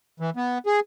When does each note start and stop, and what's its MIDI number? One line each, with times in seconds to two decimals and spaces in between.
0.20 0.30 52
0.37 0.58 59
0.66 0.80 68